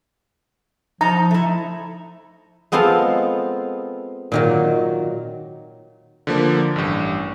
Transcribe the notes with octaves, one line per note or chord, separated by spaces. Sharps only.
F3 D#4 A#5
A3 E4
G#3 B3 C4 F4 A4 F5
A#2 D#3 F#3
D3 F3 A#3
A1 G2